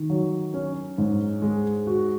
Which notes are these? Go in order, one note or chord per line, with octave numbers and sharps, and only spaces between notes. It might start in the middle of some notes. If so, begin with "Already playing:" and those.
Already playing: D#3
F#3
C#4
G#2
G#3
F#4